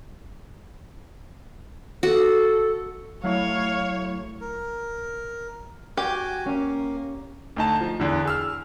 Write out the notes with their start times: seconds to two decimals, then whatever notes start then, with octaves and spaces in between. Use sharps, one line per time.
2.03 F#4 A4
3.24 F#3 A3 E4 C#5 F5
4.41 A#4
5.97 F#4 G4 G#5
6.46 A#3 C#4
7.56 D2 D#4 A5
7.81 F3
8.00 E2 D3
8.25 G#4 E6 F6